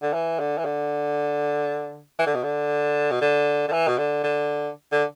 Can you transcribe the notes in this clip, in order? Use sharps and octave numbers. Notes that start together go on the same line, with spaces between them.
D3
E3
D3
E3
D3
E3
D3
B2
D3
B2
D3
D3
E3
B2
D3
D3
D3